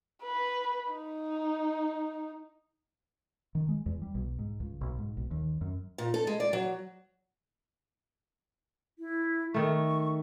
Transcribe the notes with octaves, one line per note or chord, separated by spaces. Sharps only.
B4
D#4
D#3
G#3
E2
G3
B1
G#2
C#2
B1
G#2
B1
D#2
F#2
A#2
A4
G#3
D5
F#3
E4
D#3 A3 C#6